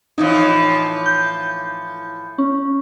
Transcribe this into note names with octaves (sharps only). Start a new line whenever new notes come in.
A2 E3 F3 D#4
G6
C#4